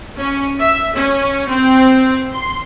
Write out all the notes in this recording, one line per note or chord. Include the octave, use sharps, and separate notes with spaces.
C#4
E5
C#4
C4
C6